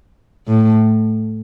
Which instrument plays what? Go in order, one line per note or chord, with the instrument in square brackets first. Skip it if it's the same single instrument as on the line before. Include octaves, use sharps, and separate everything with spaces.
[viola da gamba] A2